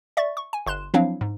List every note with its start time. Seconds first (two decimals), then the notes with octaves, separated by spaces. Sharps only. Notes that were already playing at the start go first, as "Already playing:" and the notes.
0.17 D5 E5 C#6 A6
0.37 C#6
0.53 G#5
0.66 G1 C6 F#6 E7
0.94 F3 F#3 C4 D4 E4 F5
1.21 G#2